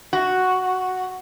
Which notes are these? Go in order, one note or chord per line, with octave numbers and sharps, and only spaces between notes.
F#4